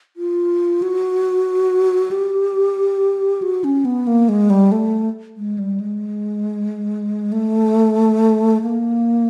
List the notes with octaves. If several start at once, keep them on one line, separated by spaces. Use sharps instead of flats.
F4
F#4
G4
F#4
C#4
B3
A#3
G#3
G3
A3
G#3
G3
G#3
A3
A#3